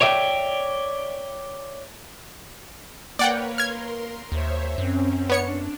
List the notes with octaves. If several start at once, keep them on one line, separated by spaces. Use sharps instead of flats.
C#5 D5 E5 G5
A#3 A#4 B4 C#5 D5 F#5 G5
A#4 C6 F6 G#6
D#2 C5 C#5 E5
F#2 C4 C#4
B3 D4 C#5 C#7